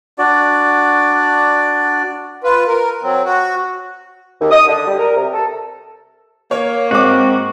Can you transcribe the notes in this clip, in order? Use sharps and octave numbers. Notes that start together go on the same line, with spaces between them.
D4 F#4 D5
F4 B4
A#4
F#3 C4
F#4
D#2
D#6
D3
G3
A#4
C3
A4
A#3 C#5
G#2 C4 F#4 D6